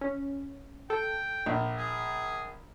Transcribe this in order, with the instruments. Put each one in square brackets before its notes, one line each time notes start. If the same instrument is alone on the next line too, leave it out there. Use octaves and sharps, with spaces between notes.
[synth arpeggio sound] C#4
[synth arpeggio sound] A4 [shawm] G5
[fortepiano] A#1
[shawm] G#4